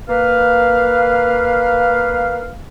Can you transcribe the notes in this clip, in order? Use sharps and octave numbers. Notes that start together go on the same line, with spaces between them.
A#3 B4 F5